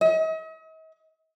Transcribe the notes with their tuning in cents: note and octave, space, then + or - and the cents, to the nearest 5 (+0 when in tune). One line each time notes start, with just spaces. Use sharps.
D#5 +45